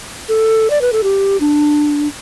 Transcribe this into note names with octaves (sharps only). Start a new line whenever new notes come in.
A4
D5
B4
A4
G4
D4